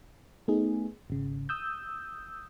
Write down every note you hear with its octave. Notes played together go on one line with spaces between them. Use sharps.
A3 B3 D#4 G#4
G#1 C#3
D#6 E6 G6